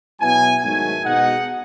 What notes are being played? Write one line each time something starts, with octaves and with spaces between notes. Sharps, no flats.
B2 F#3 B3 E4 G#5
G#2 D#3 F#3 A3 G#5
B2 G#3 D#4 F#5